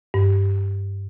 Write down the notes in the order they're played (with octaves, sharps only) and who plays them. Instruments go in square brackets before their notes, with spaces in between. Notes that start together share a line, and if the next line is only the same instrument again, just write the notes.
[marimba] G2